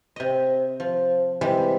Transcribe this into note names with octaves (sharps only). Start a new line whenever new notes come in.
C3 D#5
F3
C3 E3 G3 G#3